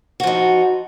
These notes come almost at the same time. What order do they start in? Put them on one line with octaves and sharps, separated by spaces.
F#4 F3 D#4